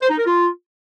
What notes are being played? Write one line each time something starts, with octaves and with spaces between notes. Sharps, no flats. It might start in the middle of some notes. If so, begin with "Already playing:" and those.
C5
D#4
A#4
F4